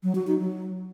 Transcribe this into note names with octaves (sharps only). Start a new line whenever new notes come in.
F#3
F#4
D#4
F#3